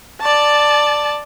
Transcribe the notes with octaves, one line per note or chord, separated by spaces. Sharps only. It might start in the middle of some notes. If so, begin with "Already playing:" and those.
D5 A5